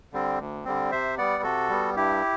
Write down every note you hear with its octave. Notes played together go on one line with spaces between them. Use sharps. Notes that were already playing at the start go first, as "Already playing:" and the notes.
D3 G3 C4
D2
D3 G3 C4
C3 C5 E5
G3 B3 D5 F#5
C3 F#4 A4
G3 B3
G2 E4 G4